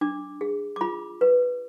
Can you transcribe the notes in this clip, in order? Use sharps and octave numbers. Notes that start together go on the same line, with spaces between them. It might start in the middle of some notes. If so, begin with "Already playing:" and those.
D4 D6
G#4
D6
F4 B5
B4